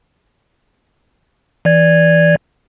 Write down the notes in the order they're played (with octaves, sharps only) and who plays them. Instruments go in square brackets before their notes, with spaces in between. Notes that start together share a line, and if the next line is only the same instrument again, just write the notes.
[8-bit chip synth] E3 D5 G#6